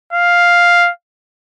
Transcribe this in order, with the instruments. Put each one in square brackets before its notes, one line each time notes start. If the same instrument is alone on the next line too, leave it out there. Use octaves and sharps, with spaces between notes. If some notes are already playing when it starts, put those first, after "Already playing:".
[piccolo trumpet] F5